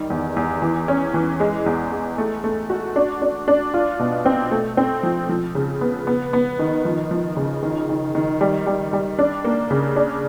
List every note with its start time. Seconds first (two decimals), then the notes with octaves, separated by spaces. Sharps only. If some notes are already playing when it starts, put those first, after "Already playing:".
Already playing: D#3 G3
0.10 E2
0.36 E2
0.62 E3
0.88 C#4
1.14 E3
1.40 G#3
1.66 E2
1.92 G#3
2.18 A3
2.44 A3
2.70 F#4
2.96 D4
3.22 D4
3.48 D4
3.74 F4
4.00 B2
4.26 C4
4.51 A3
4.77 C4
5.03 F3
5.29 F3
5.55 C#3
5.81 B3
6.07 B3
6.33 B3
6.59 D#3
6.85 F3
7.11 F3
7.37 C#3
7.63 D#3
7.89 D#3
8.15 D#3
8.41 G3
8.66 G3
8.93 G3
9.19 D4
9.44 A#3
9.71 C#3
9.96 D4